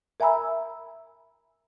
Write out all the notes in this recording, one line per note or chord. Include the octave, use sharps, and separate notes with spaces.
A#4 E5 G#5 A#5 B5 E6